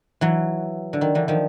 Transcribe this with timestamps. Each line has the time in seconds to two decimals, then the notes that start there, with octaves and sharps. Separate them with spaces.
0.21 E3 F#3
0.93 D3
1.01 D#3
1.15 D3 E3
1.28 D#3 F3